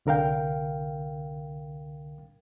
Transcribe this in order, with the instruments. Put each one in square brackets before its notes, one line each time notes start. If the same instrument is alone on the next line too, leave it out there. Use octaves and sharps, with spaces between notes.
[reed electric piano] C2 D3 A#4 F5 G5